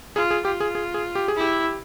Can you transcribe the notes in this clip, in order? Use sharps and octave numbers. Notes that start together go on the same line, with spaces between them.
F4 G#4
G#4
F4 G4
G#4
G#4
G#4
G4
G#4
E4
G4